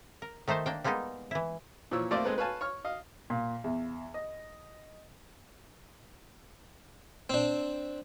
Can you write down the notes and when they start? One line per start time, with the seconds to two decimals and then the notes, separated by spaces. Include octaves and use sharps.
0.22 A#4
0.48 D#3 A3 D#4 C5 A5
0.66 A#3 D4 G5
0.84 G3 G#3 A#3 B3 D#4
1.31 E3 E4
1.91 A#2 E3 F3 C#5 E6
2.11 A3 A#3 C4 C5 D5
2.25 G#3 C4 A4 B4
2.38 B4 C#5 F5 G#5 A5
2.61 C#5 C#6 F6
2.85 D#5 F5
3.30 A#2
3.64 E2
4.14 D#5
7.30 C4 D4